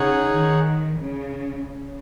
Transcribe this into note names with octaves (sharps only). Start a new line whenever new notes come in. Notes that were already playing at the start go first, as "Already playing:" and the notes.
Already playing: C#3 D#4 G#4 C#5 F#5
D#3
C#3
C#3